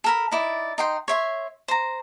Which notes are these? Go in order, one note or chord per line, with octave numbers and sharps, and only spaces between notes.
A4 A#4 B5
D#4 E4 D5
D#4 G5 C6
C#5 E5 C6
C5 A#5